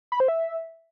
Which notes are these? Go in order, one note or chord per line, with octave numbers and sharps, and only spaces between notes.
B5
C5
E5